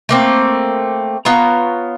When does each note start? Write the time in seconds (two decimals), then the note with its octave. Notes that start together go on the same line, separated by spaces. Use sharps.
0.09 A3 A#3 C4
1.25 B3 F4 C#5 A#5